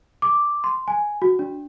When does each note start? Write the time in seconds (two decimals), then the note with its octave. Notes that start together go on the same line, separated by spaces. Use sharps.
0.22 D6
0.64 C6
0.88 G#5
1.22 F#4
1.39 D4